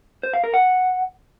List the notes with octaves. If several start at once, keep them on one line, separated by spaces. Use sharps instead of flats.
C5
F5
A#4
F#5